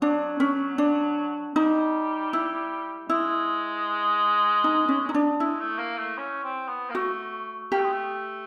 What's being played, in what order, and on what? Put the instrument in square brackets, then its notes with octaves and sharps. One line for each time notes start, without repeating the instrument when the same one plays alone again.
[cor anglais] F#3 [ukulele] D4
[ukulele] C#4
D4
[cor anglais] G3 [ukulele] D#4
[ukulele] E4
[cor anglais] G#3 [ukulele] E4
[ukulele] D#4
C#4
D#4
D4
[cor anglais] G#3 [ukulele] E4
[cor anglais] A3
A#3
A3
C#4
C4
B3
A#3
[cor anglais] A3 [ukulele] F#4
[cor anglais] A#3 [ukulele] G4
[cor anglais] A3
G#3
A3